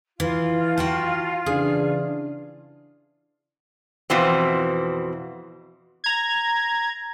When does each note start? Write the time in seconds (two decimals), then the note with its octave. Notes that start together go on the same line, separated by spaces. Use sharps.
0.20 E3 F4
0.77 F#4 G5 A5
1.46 C#3 E3 D4 G#4
4.10 F2 B2 E3 C4
6.04 A#5 G#6